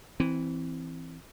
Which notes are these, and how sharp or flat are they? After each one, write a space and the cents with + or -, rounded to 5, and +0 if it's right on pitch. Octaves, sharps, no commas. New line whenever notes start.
E3 -5 C4 +0